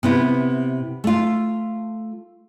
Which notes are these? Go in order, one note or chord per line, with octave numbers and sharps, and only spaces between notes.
C3 B3 E4
A3 F4